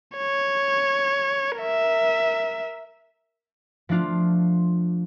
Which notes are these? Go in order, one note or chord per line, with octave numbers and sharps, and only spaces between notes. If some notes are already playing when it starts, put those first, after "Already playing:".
C#5
A#4 E5
F3 A3 D4 F4